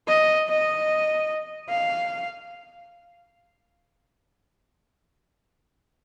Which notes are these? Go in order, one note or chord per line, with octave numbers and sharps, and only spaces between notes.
D#5
D#5
F5